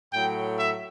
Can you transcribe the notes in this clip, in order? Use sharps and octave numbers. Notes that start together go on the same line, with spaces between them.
A2 F#3 A3 G5
E5